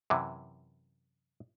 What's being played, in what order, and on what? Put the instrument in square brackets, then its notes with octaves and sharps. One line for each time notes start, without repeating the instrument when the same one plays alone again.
[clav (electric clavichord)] F#2 C3 E3